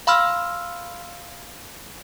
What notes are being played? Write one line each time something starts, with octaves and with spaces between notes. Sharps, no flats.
F5 B5 C6 E6 F6